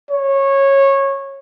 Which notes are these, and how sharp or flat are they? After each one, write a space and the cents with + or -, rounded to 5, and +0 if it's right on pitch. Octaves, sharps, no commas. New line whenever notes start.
C#5 -20